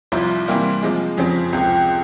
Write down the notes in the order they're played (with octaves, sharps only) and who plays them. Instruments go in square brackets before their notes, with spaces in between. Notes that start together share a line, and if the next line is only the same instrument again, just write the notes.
[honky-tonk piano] C2 C3 F3 C4 E4 [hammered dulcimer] F4
[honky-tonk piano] C3 E3 G3 A#3 E4 [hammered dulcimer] F4
[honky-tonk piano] C3 F3 G#3
F2 C#3 F3 C4
[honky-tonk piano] C#2 C3 F3 [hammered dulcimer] G4
[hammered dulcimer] G4